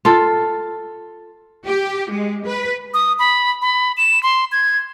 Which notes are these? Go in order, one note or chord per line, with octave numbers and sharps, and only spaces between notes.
F4 A4
G4
G#3
B4
D#6
B5
B5
E7
C6
G#6